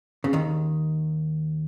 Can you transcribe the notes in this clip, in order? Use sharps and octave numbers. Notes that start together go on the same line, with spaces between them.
C#3
D#2 D#3